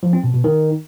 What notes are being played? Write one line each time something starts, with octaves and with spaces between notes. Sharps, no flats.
F3
C4
B2
B2
D#3